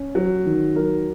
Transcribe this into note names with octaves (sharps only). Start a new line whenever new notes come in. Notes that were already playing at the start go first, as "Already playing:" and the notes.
Already playing: C#4
F#3
D#3
F#3 A#4